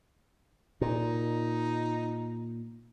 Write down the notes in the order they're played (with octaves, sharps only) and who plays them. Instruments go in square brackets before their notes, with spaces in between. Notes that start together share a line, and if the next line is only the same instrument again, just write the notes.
[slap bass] A#2 [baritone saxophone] D#4